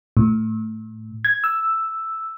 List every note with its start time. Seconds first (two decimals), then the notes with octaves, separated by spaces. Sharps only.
0.17 A2
1.25 G#6
1.44 E6